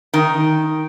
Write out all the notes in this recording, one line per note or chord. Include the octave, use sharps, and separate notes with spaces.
D#3